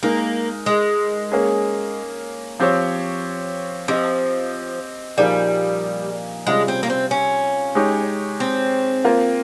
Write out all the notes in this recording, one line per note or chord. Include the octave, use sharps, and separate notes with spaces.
G#3 A#3 D#4 A#4
G#3
A#3 C#4 G#4
F3 C4 G4 C#5
F3 C4 G4 C5 D#5
A#2 F3 G3 A#3 D#4 G#4
C3 G3 G#3 C#4 F4 G#4
C4
A#3
C4
C#4
G#3 D#4 G4 C#5
C4
A#3 F4 A#4